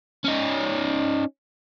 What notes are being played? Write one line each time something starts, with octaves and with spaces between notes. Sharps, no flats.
C#4 D#4